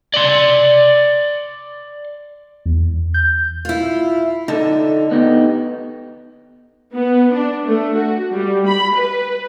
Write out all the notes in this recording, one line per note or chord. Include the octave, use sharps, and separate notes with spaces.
D5 C6
E2
G6
E4 F4
D3 D#4 A4
B3 D#4 G4
B3
D4
A3
F#4
G3
B5
B4